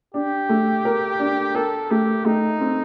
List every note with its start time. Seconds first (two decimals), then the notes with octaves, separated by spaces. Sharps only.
0.14 D4 G4
0.49 A3
0.85 A#4
1.19 D4
1.55 A4 A#4
1.91 A3 G4
2.25 A3 D#4
2.60 C4